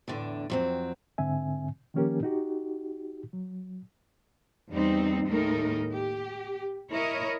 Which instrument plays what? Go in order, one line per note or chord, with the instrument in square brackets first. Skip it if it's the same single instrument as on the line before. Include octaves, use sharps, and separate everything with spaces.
[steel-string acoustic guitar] E2 A2 D3 D4
F2 F#3 C4
[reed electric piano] G#2 D3 C4 E5 G#5
D#3 F3 A#3 C#4 G4 A#4
D#4 F#4 G4
F#3
[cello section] E2 G3 C4 D#4
D#2 A2 G#3 A3 D#4 A#4
G4
E4 A#4 C#5 D#5